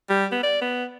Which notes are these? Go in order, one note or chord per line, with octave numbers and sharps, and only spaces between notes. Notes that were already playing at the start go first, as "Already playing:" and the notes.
G3
B3
D5
B3